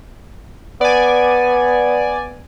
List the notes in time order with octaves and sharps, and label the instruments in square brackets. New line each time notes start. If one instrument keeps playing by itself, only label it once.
[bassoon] B3 [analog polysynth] D5 G#5